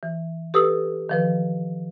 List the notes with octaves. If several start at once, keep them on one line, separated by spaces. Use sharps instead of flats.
E3
G4 A4 B4 D#6 E6
D#3 F3 B4